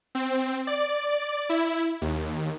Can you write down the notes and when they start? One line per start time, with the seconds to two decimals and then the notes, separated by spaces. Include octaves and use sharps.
0.15 C4
0.67 D5
1.49 E4
2.02 D#2